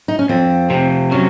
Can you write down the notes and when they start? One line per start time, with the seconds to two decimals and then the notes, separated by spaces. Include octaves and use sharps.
0.08 D#4
0.19 C#4
0.29 F2 C4
0.70 C3
1.11 F#3 C#4